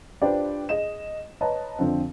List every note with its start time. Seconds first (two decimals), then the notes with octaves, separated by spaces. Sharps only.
0.22 D4 F4 G4 B4 C5 D5
0.69 G#4 D#5 E7
1.41 B4 C#5 D#5 A5 A#5
1.79 F2 D3 F3 C4